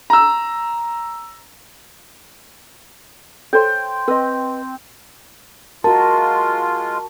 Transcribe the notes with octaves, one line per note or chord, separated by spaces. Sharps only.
A#5 E6
A4 C5 C#5 G5 C6
C4 B4 D#5
G#3 F4 F#4 A#4 A5